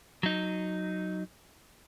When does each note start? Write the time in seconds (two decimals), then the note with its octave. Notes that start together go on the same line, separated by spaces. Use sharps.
0.23 F#3 D#4